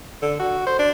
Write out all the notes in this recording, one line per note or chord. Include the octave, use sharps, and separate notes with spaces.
D3
F#4
C5
D4